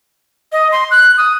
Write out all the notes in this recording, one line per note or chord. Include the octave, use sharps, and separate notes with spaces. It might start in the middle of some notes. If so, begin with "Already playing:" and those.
D#5
C6
F#6
D#6